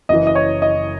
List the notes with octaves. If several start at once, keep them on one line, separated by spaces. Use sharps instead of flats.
F#1 F#2 E3 D#5
D#5
C#5
D#5